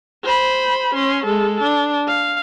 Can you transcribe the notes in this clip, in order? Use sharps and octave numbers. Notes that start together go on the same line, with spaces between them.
C5 B5
C#4 C6
G#3 A4
D4
F5